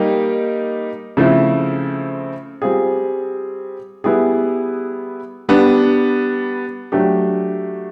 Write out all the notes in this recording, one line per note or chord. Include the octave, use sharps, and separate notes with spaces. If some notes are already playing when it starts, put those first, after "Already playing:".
Already playing: G3 A#3 D#4 G4
C#3 F3 A3 C4 E4
G3 C4 F4 G#4
G3 B3 E4 G#4
G3 B3 D4
F#3 A3 D4 G4